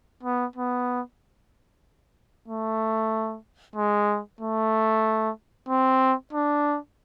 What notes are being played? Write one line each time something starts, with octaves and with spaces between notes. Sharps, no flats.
B3
B3
A3
G#3
A3
C4
D4